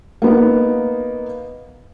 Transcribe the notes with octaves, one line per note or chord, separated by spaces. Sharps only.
A#3 B3 D#4